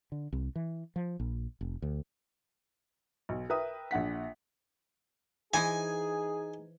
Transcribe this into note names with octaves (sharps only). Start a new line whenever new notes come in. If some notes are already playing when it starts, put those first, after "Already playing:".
D3
C2
E3
F3
A#1
F1
D2
B1
A#4 B4 E5 G5 D#6
A#1 D4 F#5 B6
E3 D#4 G#4 C5 D#5 G#5